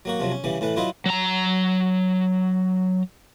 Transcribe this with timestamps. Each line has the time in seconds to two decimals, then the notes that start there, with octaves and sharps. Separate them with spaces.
0.05 F#3 A#3 F#4
0.20 C3 F3 F#3
0.31 C#4
0.44 C#3 E3 G3
0.61 A2 E3 B4
0.76 F#3 E4 F4 B4 D#5
1.06 F#3 A#5